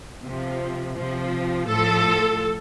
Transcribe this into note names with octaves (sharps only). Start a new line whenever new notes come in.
C3 F3
C3 F3
A2 F3 A4